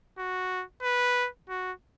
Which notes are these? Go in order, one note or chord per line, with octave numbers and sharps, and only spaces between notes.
F#4
B4
F#4